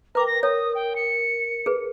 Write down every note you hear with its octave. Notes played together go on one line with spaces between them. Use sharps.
A#4 B4 G5 A#5 D6
A#6
A#4 C#5 D#6
G5
C#7
G#4 B4